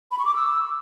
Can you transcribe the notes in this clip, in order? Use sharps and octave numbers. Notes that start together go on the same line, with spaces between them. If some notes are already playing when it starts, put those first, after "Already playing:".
B5
C#6
D6
E6